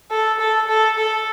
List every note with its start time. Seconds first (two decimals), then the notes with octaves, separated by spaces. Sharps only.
0.11 A4
0.40 A4
0.69 A4
0.98 A4